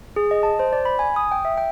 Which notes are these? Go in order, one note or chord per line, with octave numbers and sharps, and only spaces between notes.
G#4
D#5
A5
C5
D5
B5
G#5
D#6
G5
E5
G5